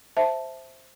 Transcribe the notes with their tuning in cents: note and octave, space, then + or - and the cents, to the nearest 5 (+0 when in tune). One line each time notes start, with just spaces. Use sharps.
C5 +0 E5 +0 A5 +0